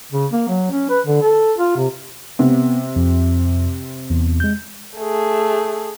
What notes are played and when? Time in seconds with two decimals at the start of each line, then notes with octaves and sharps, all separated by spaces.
0.12 C#3
0.32 A#3
0.48 F#3
0.71 C#4
0.90 B4
1.06 D3
1.21 A4
1.58 F4
1.76 C3
2.39 C3 B3
2.96 F2
4.10 E2
4.40 G#3 G6
4.97 A3 G#4